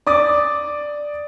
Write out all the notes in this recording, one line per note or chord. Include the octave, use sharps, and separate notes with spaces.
D5 D6 D#6 A6